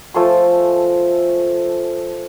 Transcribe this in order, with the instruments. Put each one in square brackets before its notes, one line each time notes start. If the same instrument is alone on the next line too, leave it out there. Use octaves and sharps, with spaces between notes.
[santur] F3 A3 G#5 C6